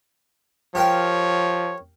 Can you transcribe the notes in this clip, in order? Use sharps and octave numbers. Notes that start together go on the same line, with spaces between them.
F3 G4 A#4 C#5 G5